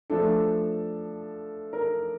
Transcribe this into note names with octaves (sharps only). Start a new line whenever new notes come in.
F3 A3 D4 A4
A#4